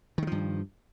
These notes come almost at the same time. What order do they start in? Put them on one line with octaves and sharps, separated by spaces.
D#3 G#3 F3 G2